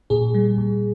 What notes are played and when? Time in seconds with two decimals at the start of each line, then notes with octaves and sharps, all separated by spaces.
0.10 A#2 G#4
0.34 G3
0.58 A#2